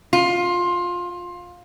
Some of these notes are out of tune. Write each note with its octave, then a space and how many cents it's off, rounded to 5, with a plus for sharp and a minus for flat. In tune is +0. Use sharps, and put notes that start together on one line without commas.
F4 +15